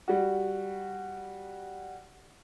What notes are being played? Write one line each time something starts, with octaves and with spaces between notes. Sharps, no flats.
G3 F#4